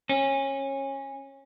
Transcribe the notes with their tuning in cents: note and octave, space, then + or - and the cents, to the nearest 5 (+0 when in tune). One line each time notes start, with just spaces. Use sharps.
C#4 -20